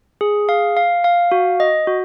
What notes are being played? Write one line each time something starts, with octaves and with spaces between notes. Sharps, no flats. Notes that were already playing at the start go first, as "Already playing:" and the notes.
G#4
F5
F5
F5
F#4
D#5
F#4